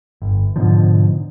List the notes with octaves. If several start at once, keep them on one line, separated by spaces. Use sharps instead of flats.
G1
G#2 B2 D3 F3